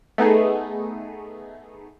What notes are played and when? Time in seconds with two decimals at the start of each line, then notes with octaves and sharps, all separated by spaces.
0.18 A3 B3 D#4 G#4